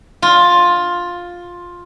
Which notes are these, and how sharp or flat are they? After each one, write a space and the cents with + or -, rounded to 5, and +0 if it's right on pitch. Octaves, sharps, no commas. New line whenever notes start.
F4 +10